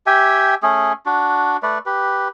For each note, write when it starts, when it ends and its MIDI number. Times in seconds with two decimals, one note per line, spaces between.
0.07 0.55 67
0.07 0.55 76
0.07 0.55 79
0.07 0.55 80
0.63 0.93 57
0.63 0.93 61
0.63 0.93 68
1.06 1.57 62
1.06 1.57 66
1.63 1.78 57
1.63 1.78 71
1.63 1.78 74
1.86 2.28 67
1.86 2.28 71